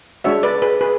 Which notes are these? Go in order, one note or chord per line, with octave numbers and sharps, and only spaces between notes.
G#3 D4 F#4 C#5 E5
B4 D5
G#4 B4
G#4 B4